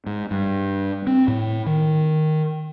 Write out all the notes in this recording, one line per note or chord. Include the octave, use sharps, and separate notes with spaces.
G#2
G2
C4
A2
D#3